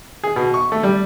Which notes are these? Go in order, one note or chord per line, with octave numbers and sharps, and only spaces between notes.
G#4
B2
C#6
A3
G3